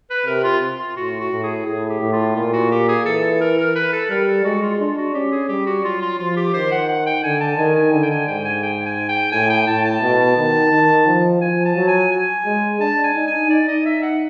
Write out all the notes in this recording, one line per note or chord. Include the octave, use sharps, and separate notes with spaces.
B4
C3 A#4
F4
F4
A2 F#4
F#4
A2
G#4
A2 G#4
G4
A2
F4
A#2 F4
F#4
G4
G#4
E3 A4
A4
A#4
A#4
B4
A4
G3 A#4
A4
G#3 F#4
F4
D4 F4
F#4
C#4 G4
G#4
G3 G4
F#4
F#3 F4
F4
F3 F4
G4
D#3 C5
F#5
F#5
G5
D3 G#5
A5
D#3 G#5
G#5
D3 G#5
G5
G#5
G#2 G5
G#5
G5
G#5
G5
A2 G#5
G5
A2 A5
A5
B2
D#3
D#3
F3
F3 G#5
A5
F#3
G#5
G#5
G#3
D4 A5
G#5
D#4
G#5
D#4 D5
D#5
E5
F#5